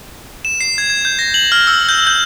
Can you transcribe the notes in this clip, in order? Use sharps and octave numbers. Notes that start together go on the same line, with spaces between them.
E7
C7
G#6
G#6
G6
A#6
F#7
F6
E6
G6
G6